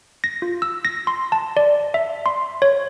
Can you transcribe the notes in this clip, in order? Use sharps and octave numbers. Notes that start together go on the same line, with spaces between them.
A#6
F4
E6
A#6
C6
A5
D5
E5
C6
C#5